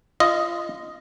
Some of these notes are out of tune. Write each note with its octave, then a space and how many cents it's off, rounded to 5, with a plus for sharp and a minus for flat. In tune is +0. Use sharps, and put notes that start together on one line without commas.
F4 -25 D#5 +0